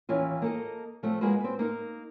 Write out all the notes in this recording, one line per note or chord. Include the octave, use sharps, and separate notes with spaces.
D#2 E3 C#4 F4
A#3 A4 D#5
F3 A3 C4
G#3 A#3 F4 F#4 B4
C4 B4
A#3 D#4 A#4